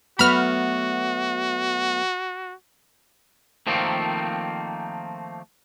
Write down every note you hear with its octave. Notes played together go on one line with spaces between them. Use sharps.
F#3 A3 B3 F#4 B5 F6
D#3 F3 A3 A#3 C4